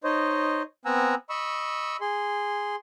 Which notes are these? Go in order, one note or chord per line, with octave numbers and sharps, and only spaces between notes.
D#4 C5 C#5 D#5
B3 C4 F#5 G#5 A#5 E6
D#5 B5 C#6 E6
G#4 C6